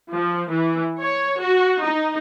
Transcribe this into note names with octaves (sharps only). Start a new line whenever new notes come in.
F3
E3
C#5
F#4
D#4